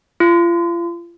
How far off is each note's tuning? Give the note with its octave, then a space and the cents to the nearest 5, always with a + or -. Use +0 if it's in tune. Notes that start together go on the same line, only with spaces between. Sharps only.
F4 -35